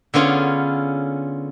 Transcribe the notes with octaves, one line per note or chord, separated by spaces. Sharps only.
D3 B3 C#4 F4 G#4